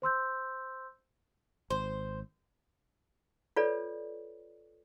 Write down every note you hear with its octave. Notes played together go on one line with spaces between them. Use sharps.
C5 C6 E6 G6
G#1 C5
F4 A4 B4 C#5 D5